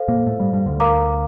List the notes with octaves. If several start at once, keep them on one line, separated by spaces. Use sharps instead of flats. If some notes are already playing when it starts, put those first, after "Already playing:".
Already playing: A4 C5 F5
A#2 A#3
A2 A3
G2 G3
G2 G3
D2 D3
A#4 F5 A#5 D6